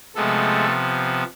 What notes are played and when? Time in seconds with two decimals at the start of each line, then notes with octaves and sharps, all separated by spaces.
0.16 C3 F3 G#3 A3 B3 A4